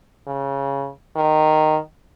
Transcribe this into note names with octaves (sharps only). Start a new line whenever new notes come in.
C#3
D#3